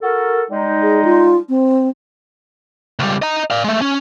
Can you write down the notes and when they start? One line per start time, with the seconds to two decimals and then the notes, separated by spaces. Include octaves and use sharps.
0.02 F#4 A4 A#4
0.50 G3 G#3 D#4
0.82 G#4
1.05 F4
1.49 C4
2.99 C#2 G3
3.22 D#5 A#5
3.51 D5 F5
3.64 G#3 A3
3.81 C#4